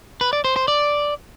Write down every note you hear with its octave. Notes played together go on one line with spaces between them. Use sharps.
B4
D5
C5
C5
D5